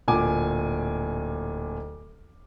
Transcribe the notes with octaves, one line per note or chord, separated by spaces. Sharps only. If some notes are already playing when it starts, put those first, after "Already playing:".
D1 A#2 G#5 D6